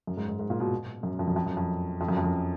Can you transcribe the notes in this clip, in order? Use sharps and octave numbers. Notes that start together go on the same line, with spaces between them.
F#2
G#2
G#2
G#2
A#2
B2
F#2
F2
F#2
F2
F#2
F2
F2
F#2
F2
F#2